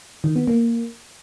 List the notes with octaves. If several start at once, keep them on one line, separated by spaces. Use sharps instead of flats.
D#3
B3
A#3